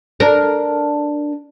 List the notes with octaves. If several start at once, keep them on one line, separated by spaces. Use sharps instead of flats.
D4 A#4